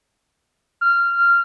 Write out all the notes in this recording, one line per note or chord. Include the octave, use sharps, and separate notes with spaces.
F6